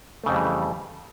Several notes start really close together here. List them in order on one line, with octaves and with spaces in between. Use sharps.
A3 C#3 F2 G3 E3